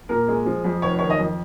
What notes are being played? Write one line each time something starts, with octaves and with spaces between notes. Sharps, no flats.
A#2 A#4
G#3
F3
F2
F1 C#5
D#3 C#5
D#5
F2